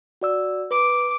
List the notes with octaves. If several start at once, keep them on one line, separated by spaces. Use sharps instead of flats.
F#4 D5 E6
B4 D6